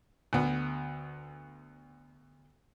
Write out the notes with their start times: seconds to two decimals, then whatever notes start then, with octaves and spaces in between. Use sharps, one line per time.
0.33 D2 B3